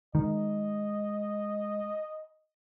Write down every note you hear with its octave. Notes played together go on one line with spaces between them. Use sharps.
D#3 G#3 D#5